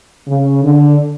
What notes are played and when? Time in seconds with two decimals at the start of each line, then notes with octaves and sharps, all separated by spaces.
0.26 C#3
0.62 D3